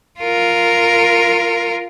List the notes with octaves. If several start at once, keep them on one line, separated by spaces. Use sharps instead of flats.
F4 A#4